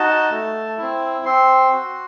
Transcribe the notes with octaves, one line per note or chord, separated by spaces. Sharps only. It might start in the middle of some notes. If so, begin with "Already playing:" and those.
Already playing: D#4 F#4 A5
A3
C4 E4
C4 C6
F#4